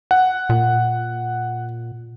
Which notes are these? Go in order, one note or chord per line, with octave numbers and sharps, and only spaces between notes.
F#5
A#2